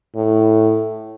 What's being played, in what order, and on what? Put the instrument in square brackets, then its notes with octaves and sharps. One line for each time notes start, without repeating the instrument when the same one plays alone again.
[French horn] A2